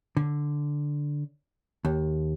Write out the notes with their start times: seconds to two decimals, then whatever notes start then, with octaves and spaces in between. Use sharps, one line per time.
0.17 D3
1.85 D#2